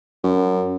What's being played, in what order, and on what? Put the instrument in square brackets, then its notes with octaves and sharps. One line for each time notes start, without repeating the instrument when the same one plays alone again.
[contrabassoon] F#2